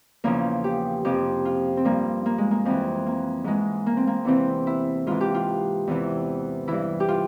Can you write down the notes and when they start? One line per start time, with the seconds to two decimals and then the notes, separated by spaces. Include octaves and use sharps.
0.24 E2 C#3 F3 A#3
0.64 G4
1.05 F2 C3 F3 G4
1.45 F4
1.77 C4
1.85 G2 F3 A#3
2.26 A#3
2.38 G#3
2.51 A#3
2.65 F2 E3 C4
3.06 A#3
3.44 G#2 E3 G#3
3.86 A#3
3.97 C4
4.07 A#3
4.25 E2 C3 E3 C4
4.67 E4
5.06 G#2 E3 F4
5.21 G4
5.34 F4
5.87 E2 C3 E3
6.68 G2 E3 E4
7.00 G4
7.08 F4